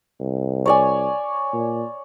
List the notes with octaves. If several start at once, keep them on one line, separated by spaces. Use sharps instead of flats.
C2
C#5 D5 G#5
A#2